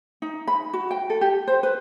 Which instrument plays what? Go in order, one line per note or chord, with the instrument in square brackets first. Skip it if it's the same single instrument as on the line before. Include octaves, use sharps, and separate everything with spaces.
[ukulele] D#4
B5
F#4
G5
A4
G4
C5
B4